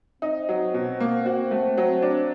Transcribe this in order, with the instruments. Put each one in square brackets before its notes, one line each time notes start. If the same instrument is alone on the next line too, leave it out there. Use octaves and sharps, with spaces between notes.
[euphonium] C4 [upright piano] D#4
[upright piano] F#3
B2
A#3
[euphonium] C4 [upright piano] F#4
[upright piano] A3
F#3
D4